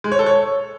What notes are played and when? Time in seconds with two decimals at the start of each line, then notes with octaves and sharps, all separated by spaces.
0.04 G#3
0.12 C#5
0.19 A4
0.26 C#5